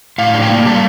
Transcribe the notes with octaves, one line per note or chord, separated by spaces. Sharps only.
A2 F5
D4
G5
A#3
G3 A5